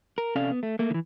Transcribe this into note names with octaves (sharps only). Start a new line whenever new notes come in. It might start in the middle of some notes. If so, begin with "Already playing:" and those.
A#4
C3 C#4 A4 D5 F5
B3
A3
A3 A#3
D#3 E3